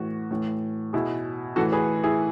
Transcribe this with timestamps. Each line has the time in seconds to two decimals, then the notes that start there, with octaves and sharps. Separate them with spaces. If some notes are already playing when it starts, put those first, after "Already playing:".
Already playing: A2 E3 F#4
0.31 A2 E3
0.93 B2 E4 G#4
1.56 A2 E3 F#4 A4
1.72 G#4 B4
2.03 E4 G#4